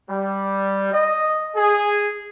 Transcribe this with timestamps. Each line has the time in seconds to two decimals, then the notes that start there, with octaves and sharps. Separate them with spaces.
0.10 G3
0.93 D#5
1.56 G#4